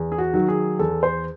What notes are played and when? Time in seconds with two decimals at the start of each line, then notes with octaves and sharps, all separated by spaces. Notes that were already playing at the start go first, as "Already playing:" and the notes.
Already playing: E2
0.12 G#4
0.18 F#4
0.34 D#3 F#3
0.48 G#4
0.79 E2 A4
1.03 C5